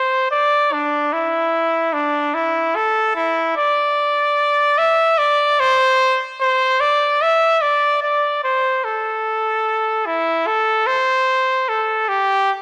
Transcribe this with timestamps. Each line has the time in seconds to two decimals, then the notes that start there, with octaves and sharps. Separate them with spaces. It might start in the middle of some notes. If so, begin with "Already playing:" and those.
Already playing: C5
0.31 D5
0.72 D4
1.13 E4
1.93 D4
2.34 E4
2.76 A4
3.15 E4
3.57 D5
4.78 E5
5.18 D5
5.60 C5
6.41 C5
6.80 D5
7.22 E5
7.62 D5
8.03 D5
8.44 C5
8.84 A4
10.06 E4
10.47 A4
10.87 C5
11.69 A4
12.08 G4